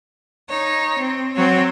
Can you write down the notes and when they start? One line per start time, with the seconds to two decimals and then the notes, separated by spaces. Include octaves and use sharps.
0.49 D#4 C#5
0.98 C4
1.35 F#3 C4 F#4 C#5